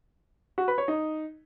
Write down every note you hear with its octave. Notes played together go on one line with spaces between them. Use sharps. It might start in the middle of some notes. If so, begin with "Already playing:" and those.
F#4
B4
C#5
D#4